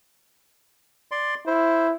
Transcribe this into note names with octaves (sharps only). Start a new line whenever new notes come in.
D5 C6
E4 C5